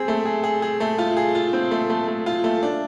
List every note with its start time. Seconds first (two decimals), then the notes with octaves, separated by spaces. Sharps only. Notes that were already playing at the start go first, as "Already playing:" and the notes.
Already playing: C4 G#4
0.08 A3
0.25 G#4
0.44 G#4
0.62 G#4
0.80 A3
0.98 F4
1.17 G#4
1.35 F4
1.53 C4
1.71 A3
1.90 A3
2.08 A3
2.26 F4
2.44 A3
2.63 D4